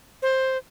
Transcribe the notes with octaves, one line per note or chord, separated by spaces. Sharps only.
C5